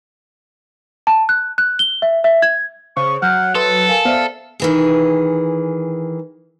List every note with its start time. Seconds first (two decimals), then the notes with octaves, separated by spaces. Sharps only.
1.07 A5
1.29 F#6
1.58 F#6
1.79 G7
2.02 E5
2.24 E5
2.42 G#6
2.97 C#3 C5 C#6
3.22 F#3 F#5 F6 G6
3.55 A4 B4 E5 C6 D#6
3.89 A#4 F5 G#5
4.05 B3 C5 D5 E5 F5
4.60 D#3 E3 G#4